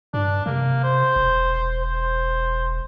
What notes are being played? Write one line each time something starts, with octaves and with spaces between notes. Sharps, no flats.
G2 D4
C3 A#3
C5
E1
C5